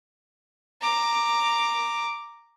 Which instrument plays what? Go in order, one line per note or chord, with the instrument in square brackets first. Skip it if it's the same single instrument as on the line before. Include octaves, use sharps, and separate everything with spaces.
[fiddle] A#5 D6